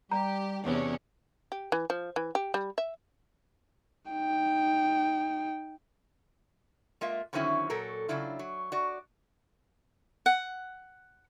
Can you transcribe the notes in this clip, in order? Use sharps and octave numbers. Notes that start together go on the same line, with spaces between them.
G3 G4 A#5
E2 C3 C#4 D4
G4
E3
F3
E3
G4
G3
E5
D#4 G5
G#3 A#3 F4 E5
D3 D#3 F#3 C4 C#4 E4
A#2 F#3 A4 A#4
C#3 F#3 D4 E4 F4
F#3
F#4 D5
F#5